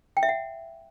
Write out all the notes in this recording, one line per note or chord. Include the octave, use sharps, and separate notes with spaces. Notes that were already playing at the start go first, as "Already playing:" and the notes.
G5
E5
F#5